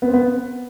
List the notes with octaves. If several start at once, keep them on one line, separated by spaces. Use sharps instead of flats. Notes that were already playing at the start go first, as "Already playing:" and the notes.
B3
C4
B3